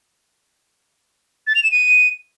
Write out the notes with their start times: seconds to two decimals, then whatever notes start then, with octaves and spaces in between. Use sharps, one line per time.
1.47 A6
1.55 F7
1.63 E7
1.71 D#7